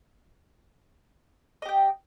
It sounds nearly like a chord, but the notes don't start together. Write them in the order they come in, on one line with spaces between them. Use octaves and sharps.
D#5 G4 G5